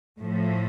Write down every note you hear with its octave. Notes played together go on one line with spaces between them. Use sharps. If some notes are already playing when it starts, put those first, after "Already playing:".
A2 F3 A3